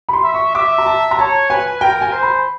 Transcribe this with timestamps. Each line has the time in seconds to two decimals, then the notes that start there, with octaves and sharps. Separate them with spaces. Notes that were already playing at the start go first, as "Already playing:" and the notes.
0.09 B5
0.13 C6
0.24 E5
0.34 C#6
0.55 E5 D6
0.78 A#5
0.86 A5
1.11 A#5
1.19 C#5 A5
1.50 B4 G#5
1.81 A#4 G5
2.01 G#5
2.12 C5
2.23 B5